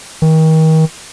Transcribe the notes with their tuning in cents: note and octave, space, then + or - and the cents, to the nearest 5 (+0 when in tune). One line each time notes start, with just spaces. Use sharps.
D#3 +35